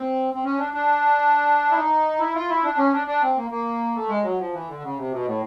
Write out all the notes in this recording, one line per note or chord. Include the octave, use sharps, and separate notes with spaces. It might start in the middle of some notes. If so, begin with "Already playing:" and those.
Already playing: C4
C4
C#4
D4
D4
E4
D#4
E4
F4
E4
D4
C#4
D4
D4
C4
A#3
A#3
A3
G#3
F#3
F3
E3
D3
C#3
C3
B2
A2